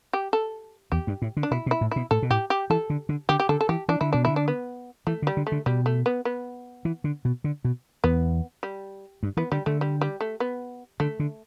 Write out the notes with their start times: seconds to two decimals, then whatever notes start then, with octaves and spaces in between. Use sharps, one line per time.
0.13 G4
0.33 A4
0.92 E2 G4
1.07 G2
1.22 A2
1.37 D3
1.43 D4
1.51 B2 E4
1.66 B2
1.71 E4
1.81 A2
1.91 B2 E4
2.11 A2 A4
2.22 B2
2.30 A2 G4
2.50 G4
2.70 E3 A4
2.90 D3
3.09 D3
3.29 D3 G4
3.40 G4
3.49 D3 A4
3.61 A4
3.69 E3 G4
3.89 E3 D4
4.01 D3 E4
4.13 B2 D4
4.25 D3 E4
4.36 D4
4.48 B3
5.07 E3 A3
5.22 D3
5.27 G3
5.37 D3
5.47 A3
5.52 D3
5.66 B2 G3
5.86 A3
6.06 B3
6.25 B3
6.85 E3
7.04 D3
7.25 B2
7.44 D3
7.65 B2
8.04 E2 B3
8.63 G3
9.23 G2
9.37 E3 B3
9.52 D3 G3
9.66 D3 A3
9.81 G3
10.01 G3
10.21 A3
10.40 B3
11.00 D3 A3
11.20 D3